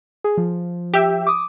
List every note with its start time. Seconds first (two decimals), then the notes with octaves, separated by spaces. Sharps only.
0.24 G#4
0.37 F3
0.94 G4 E5
1.27 D6 D#6